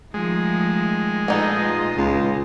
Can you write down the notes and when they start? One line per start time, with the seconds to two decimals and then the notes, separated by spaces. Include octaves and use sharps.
0.14 D#3 F3 G#3 A3
1.28 A#2 B3 D#4 F4 A4 D#5
1.97 C#2